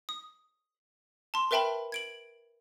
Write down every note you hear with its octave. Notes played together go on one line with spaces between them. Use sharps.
D#6
A5 C6
A#4 B4 E5 G5 A5 B5
G#6 D7 F#7